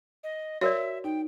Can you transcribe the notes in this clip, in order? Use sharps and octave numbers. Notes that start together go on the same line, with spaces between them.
D#5
F#4 A#4 C#5 D5 E5
D#4 G5